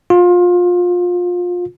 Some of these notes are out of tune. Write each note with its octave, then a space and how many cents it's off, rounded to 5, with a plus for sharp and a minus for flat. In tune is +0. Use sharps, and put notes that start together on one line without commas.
F4 +25